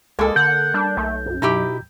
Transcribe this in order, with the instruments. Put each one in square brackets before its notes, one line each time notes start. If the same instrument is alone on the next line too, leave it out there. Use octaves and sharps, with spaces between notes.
[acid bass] C#2 [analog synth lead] G#3 [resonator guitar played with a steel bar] A#3 A4
[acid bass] D3 [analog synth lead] F#5 [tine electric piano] G6
[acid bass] G3 [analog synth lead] D4
[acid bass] B1 [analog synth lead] A3
[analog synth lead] F#2
[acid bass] B2 [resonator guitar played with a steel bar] D#4 E4 G4